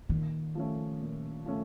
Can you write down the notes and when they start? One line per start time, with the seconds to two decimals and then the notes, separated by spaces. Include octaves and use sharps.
0.09 A#2 D#3
0.55 F3 A3 C#4
1.01 A#2
1.46 F3 A3 C#4